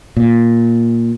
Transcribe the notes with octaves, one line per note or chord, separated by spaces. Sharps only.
A#2